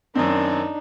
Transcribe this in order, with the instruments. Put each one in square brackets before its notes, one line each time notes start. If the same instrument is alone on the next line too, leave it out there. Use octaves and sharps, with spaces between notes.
[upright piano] F#2 D#3 C4 [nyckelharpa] D4 D#4